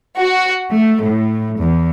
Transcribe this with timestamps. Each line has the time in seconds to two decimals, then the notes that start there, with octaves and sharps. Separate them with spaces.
0.18 F#4
0.72 A3
1.03 A2
1.59 E2